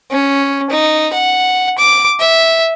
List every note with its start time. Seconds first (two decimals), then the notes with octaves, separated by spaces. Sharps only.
0.11 C#4
0.70 D#4
1.13 F#5
1.78 D6
2.20 E5